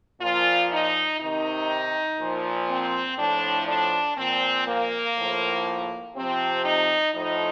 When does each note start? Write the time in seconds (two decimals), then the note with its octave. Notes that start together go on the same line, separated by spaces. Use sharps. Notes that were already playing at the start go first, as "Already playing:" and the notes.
0.21 A#2 F3 F4
0.72 D#4
1.20 C3 D#3 D#4
2.19 A#2 F3
2.70 C4
3.18 A2 F3 D4
3.68 D4
4.18 A#2 F3 C4
4.68 A#3
5.17 A2 F3
6.15 C3 F3 C4
6.65 D#4
7.15 A2 F3 D#4